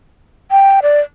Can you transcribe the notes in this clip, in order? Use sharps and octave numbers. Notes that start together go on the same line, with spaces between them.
G5
D5